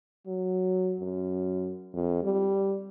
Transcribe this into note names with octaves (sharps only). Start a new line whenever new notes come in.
F#3
F#2
F2
G3